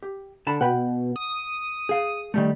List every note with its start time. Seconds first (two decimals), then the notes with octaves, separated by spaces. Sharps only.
0.03 G4
0.47 D3 A5 B5
0.61 B2 F#5 G5 B5
1.16 D#6
1.89 G#4 F5
2.34 D#3 G3 A3